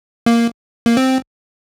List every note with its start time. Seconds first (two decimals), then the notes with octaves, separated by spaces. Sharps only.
0.26 A#3
0.86 A#3
0.97 C4